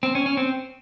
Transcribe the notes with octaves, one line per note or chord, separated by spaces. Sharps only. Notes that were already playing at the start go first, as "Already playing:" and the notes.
C4
C#4
C#4
C4